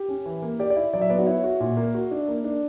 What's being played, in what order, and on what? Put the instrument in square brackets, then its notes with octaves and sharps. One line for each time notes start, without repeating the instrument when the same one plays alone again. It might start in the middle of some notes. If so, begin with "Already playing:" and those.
Already playing: [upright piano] G4
[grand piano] C#4
E3
A#3
[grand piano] G4 [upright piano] D5
[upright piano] D5
[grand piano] E4
[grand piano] F#3 [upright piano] D5
[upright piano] E5
[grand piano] B3 [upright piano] D5
[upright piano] F#4
[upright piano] E4 [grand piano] C#5
[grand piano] F#4
A#2
A#3
F#4
D4
A#3
D4